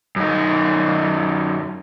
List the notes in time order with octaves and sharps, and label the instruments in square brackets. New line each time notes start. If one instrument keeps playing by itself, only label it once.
[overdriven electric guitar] F#2 D#4